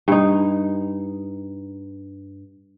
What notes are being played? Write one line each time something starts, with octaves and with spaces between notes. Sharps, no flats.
G2 D#4